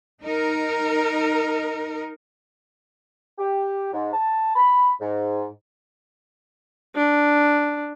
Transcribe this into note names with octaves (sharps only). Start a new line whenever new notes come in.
D#4 A#4
G4
G#2
A5
B5
G#2
D4